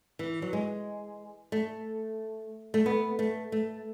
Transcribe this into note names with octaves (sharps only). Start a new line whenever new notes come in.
E3
F#3
G#3
A3
A3
B3
A3
A3